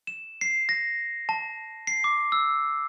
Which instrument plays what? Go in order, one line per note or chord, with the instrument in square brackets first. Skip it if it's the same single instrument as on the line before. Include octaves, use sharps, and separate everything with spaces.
[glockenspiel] E7
C7
A#6
A5
C7
D6
E6